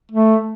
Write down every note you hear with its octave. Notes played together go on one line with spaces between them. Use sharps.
A3